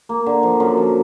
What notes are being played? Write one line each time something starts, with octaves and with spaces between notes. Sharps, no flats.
A#3
D3
F3
F#2
F3